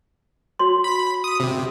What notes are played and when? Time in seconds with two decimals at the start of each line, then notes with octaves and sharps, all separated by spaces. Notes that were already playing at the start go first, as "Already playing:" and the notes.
0.59 F#4 C#5 C6
0.84 B5
1.24 D#6
1.40 C3